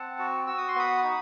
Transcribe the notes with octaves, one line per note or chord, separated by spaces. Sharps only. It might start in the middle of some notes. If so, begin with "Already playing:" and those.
Already playing: C4 F#5 A5
F#4
F#4 E6
D#6
C6
B3 B5 D#6
D#4